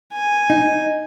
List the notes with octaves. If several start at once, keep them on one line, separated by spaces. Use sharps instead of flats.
G#5
D#4